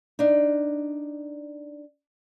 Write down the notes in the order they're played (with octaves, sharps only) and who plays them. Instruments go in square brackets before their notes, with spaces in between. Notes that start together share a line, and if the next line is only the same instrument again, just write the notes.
[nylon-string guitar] D4 D#4